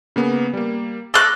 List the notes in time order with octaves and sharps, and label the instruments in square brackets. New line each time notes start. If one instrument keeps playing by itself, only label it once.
[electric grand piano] C#3 A#3 B3
G3 A#3
[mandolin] A4 F#6 [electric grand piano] D6 F6 A#6